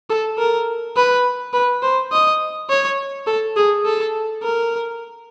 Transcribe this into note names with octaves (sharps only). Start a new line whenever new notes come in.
A4
A#4
B4
B4
C5
D#5
C#5
A4
G#4
A4
A#4